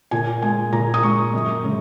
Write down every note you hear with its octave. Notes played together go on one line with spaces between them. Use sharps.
A#2 G#5
G#3 G#5
A#2 A#5
D#6
G#3 C#6
F#2
C#3 G#3